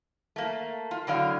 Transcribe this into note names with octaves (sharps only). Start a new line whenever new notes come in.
A3 A#3
F4
A2 D3 F#3 F5